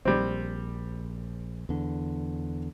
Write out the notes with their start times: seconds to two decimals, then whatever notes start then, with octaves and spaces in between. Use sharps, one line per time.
0.05 A#1 G3 C4
1.69 E2 D3